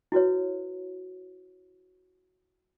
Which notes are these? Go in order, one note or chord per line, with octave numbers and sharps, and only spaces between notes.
E4 F#4 B4 C#5